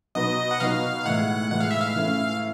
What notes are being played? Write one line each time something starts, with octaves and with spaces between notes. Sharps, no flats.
B2 F#3 B3 D#4 F#4 D#5
F#5
B2 F#3 B3 D#4 F#4 F5
A2 E3 G#3 F#5
A2 E3 G#3 F#5
F5
E5
F5
E3 A3 C#4 E4